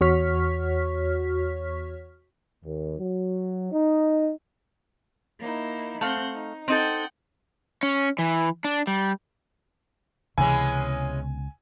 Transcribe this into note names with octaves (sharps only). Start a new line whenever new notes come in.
E2 F#4 C#5 C#6 F6 B6
D#2
F#3
D#4
A#3 D#4 E4
A3 C4 F5 F#5 G6
D#4
C4 D#4 A4 F#5 G5
C#4
E3
D4
G3
C#2 C3 E3 G#3 B3 C#4 G#5